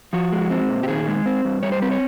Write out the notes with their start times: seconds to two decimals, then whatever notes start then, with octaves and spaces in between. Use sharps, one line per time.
0.13 F3 F#4
0.32 G#3
0.50 C4
0.70 A#2
0.83 G4
0.88 D#3 G#4
1.08 G#3
1.26 C4
1.45 G2
1.63 G3 C#5
1.72 C5
1.82 C4 B4
1.91 C#5